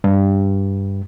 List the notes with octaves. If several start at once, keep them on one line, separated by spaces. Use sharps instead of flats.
G2